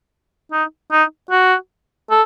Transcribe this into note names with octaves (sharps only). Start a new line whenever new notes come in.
D#4
D#4
F#4
A4